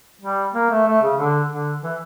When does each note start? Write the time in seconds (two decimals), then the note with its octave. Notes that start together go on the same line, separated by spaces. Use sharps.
0.21 G3
0.54 A#3
0.70 A3
0.87 A3
1.02 C#3
1.18 D3
1.50 D3
1.83 E3